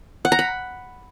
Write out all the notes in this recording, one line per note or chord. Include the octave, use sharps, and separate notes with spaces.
F#5
A#5
B5